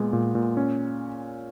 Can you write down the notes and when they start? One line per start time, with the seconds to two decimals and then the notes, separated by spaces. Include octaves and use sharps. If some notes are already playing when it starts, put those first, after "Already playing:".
Already playing: A#2 G#3 B3
0.13 A#2
0.35 A#2
0.57 C#4